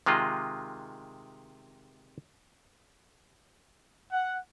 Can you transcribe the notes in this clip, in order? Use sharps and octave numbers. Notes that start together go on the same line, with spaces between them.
C3 D#3 G#3 F4 D#5
F#5